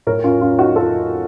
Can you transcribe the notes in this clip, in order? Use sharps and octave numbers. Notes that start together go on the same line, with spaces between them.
A2 A#4 C#5
C#4 F4
C#4 F4
D#4 F#4
F4 A4